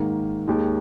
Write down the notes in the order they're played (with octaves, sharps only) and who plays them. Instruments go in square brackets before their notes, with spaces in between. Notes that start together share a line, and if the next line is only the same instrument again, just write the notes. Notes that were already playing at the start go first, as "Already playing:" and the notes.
Already playing: [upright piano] G#2 D#3 A#3
D#2 D#3 G#3